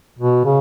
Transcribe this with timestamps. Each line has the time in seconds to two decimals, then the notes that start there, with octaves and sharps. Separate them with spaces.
0.19 B2
0.45 C#3